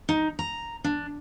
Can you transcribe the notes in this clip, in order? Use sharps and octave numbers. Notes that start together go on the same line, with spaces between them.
D#4
A#5
D4